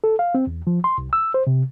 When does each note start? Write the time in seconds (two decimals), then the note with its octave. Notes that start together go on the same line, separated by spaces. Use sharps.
0.04 A4
0.19 F5
0.35 C4
0.47 E2
0.67 F3
0.84 C6
0.98 C2
1.13 E6
1.34 C5
1.47 C3